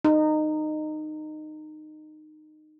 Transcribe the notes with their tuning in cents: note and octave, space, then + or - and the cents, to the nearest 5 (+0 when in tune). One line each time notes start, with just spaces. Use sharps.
D#4 -20